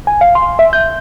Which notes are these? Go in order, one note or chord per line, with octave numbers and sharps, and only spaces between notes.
G#5
F5
C6
E5
G6